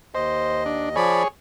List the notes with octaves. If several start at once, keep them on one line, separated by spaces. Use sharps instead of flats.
D#2 C5 D#5
D4
F3 G#4 C#5 D5 B5